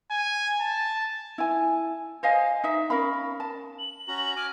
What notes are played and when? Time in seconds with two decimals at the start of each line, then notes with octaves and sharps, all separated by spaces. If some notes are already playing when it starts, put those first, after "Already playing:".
0.11 G#5
0.60 A5
1.38 E4 G#5
2.23 C5 D#5 F5 G#5
2.64 D#4 E5
2.90 C#4 A#4 F5 B5
3.40 A5
3.79 F#7
4.08 C#4 F#4 A#5
4.36 G#5 D6 F6